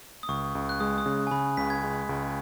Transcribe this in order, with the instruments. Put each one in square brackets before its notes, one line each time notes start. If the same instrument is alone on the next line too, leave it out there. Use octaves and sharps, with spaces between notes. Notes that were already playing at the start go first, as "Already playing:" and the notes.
[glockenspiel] D#6
[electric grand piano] C#2 [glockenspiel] C#6
[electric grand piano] C#2
[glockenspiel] F#6
[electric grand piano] G#3 [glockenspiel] D#6
[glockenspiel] D#6
[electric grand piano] C#3
[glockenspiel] G#5
[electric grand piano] C#3 [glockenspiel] B5
[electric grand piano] C#2 [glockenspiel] B6
[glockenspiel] G#6
[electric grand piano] G#3
C#2